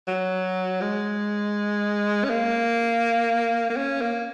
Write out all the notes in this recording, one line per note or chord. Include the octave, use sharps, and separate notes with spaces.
F#3
G#3
C#4
A#3
A#3
C#4
A#3